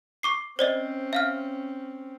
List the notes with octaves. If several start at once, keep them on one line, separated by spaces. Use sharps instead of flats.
C#6 D6 C7
C4 C#4 C5 D5 D#5
E5 F5 F6